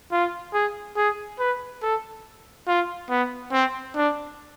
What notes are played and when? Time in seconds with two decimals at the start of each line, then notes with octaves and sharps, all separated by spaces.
0.12 F4
0.54 G#4
0.96 G#4
1.39 B4
1.82 A4
2.68 F4
3.10 B3
3.52 C4
3.96 D4